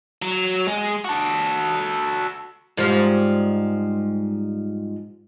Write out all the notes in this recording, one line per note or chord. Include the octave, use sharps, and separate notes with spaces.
F#3
G#3
F#4 A4
G#2 F3 G3